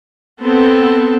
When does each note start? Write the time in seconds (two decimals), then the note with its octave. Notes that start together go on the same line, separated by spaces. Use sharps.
0.43 B3 C4 A4